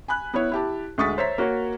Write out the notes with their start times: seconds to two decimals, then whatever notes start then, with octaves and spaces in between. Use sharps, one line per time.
0.08 G#5 B5 F#6
0.34 B3 E4 C#5
0.52 E4 G4 A5
0.98 D2 G#3 C#6 D#6 A6 B6
1.18 C5 C#5 E5 A#5 B6
1.38 A#3 F#4 C#5